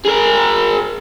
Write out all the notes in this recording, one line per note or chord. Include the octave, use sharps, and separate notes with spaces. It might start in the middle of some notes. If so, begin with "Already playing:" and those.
G#4 A#4